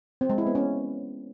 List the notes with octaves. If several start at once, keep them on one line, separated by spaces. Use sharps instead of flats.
C4
G#3
E4
B3
C#4